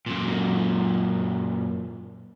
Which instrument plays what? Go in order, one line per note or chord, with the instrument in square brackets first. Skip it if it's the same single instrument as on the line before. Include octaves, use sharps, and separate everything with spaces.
[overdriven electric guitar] F#2 A#2